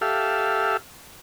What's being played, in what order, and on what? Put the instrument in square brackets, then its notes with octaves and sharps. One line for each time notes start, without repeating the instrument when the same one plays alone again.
[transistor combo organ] G4 A4 E5 F5